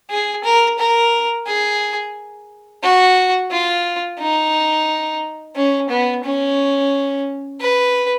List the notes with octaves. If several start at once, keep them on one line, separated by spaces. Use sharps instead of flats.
G#4
A#4
A#4
G#4
F#4
F4
D#4
C#4
B3
C#4
B4